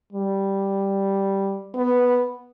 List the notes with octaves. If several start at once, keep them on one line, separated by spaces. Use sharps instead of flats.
G3
B3